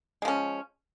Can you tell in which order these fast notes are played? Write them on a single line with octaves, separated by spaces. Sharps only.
G#3 F3 C#4